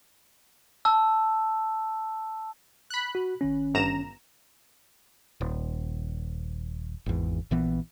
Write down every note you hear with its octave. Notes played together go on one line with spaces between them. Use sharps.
A5 E6
B5 F#6
F#4
G#1 D#3 C#4
G1 A#5 E7
D#1
G#1 E2
A#1 E3 B3